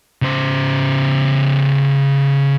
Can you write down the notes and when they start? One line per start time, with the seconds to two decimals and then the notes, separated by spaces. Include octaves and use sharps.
0.22 C#3 C5